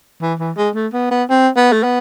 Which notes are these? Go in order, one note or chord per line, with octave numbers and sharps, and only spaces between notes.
E3
E3
G#3
A3
B3
B3
C4
B3
A3
B3